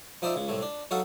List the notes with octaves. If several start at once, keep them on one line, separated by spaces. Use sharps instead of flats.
F3 D#4 C5 D5 E5
C#2 C#3
C2 A2 A3
D4
F#3 D#4 F#4 A4 F5